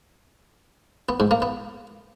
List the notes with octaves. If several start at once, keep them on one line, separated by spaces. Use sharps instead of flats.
B3
G#2
A#3
B3